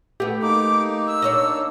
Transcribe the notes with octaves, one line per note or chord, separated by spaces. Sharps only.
A3 B3 G4
A#3 D#4 D6
E6
D4 C#5 D#5